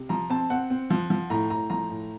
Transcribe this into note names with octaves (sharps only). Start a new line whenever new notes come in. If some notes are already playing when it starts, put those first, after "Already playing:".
Already playing: C3
F3 A#5
C4 A5
C4 F#5
C4
F3
F3
A2 A#5
A2 A#5
F3 A#5
A2